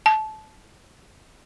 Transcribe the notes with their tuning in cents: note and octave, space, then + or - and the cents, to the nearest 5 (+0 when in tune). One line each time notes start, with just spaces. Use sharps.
A5 -20